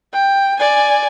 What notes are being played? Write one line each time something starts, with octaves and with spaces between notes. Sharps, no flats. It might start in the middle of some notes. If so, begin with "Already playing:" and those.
G5
D5 G#5